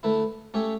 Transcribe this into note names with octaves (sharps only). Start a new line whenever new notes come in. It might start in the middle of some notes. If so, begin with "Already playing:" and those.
D3 A3 E4 B4
A3 C#4 G4 C#5 E5